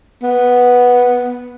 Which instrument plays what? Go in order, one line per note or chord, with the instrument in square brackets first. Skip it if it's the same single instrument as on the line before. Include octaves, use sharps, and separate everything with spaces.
[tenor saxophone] B3